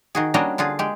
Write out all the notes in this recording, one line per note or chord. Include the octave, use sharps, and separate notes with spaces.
D#3 F#4 G#4
G3 A#3 C#4 D4 F#4 D#5
D3 F4 F#4 G#4
G#3 G4